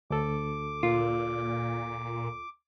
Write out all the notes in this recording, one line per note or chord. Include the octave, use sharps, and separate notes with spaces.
D2 A4 D6
A#2 F4